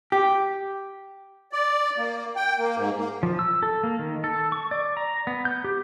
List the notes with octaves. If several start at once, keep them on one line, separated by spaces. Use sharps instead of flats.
G4
D5
A#3
G5
A#3
G#2
A#3
F3
E6
A4
A#3
D#3
A4
C#6
D5
A#5
B3
G6
G4